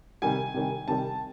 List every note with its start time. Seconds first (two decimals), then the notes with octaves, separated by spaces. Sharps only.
0.22 C3 D#3 G3 G#5
0.54 C3 D#3 G3
0.88 C3 D#3 G3 A5